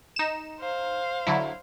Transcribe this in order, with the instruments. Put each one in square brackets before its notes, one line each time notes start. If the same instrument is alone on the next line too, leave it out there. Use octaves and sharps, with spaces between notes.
[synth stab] D#4 E7
[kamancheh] C5 F5
[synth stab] D3 F#3 E4